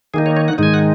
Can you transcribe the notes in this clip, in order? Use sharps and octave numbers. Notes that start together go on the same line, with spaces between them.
D#3 A#3 D#4 G#4
C#5
C#5
F#5
G#2 D#3 G#3 D#4 G#5
F#5